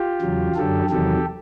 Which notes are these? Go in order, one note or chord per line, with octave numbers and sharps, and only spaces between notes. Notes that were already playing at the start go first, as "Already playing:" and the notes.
Already playing: F4 G4
E2 C#3 F#3
F#2 D3 F#3 G4 A4
E2 C3 D#3 F#3 G4 A4